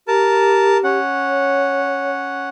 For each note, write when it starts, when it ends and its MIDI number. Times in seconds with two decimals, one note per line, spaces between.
0.08 0.99 67
0.08 0.77 70
0.08 0.77 81
0.84 2.49 61
0.84 2.49 78
1.28 2.10 73